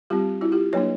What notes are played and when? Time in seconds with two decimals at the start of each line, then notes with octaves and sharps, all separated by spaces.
0.10 G3 C4 F4 G4
0.41 E4 F#4
0.52 F4 G4
0.73 F#3 A#3 D4 B4 C#5